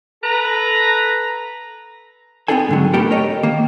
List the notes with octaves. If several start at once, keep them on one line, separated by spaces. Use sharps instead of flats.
A4 B4 A#5
B3 C4 D#4 G#4 A4 G#5
G#2 D3 F#3
A3 B3 G4 A4 A#4
A#4 C#5 D#5
D#3 A#3